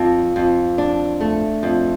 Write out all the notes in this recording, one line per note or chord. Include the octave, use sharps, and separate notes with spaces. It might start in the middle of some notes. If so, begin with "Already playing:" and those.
Already playing: F2
F2
D4
A3
F2